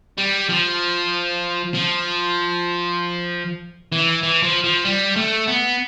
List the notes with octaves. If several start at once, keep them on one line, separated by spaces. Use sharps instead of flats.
G3
F3
F3
E3
E3
F3
F3
G3
A3
B3